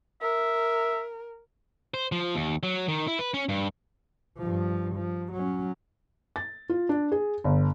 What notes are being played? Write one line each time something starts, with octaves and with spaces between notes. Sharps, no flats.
A#4 E5
C5
F3
D#2
F#3
D#3
E4
B4
C#4
G2
G2 F3
F3
F#3 C#4
A6
F4
D4
G#4
G1